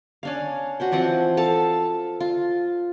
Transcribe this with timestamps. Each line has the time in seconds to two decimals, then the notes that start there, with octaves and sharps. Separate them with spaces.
0.23 C#4 D4 F5
0.80 F#4 B4 C5
0.92 E3 F3 C4 F#5
1.37 A4 F5 A5
2.20 F4